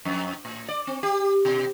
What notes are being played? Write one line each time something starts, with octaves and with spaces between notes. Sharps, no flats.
F2
A2
D5
C4
G4
B2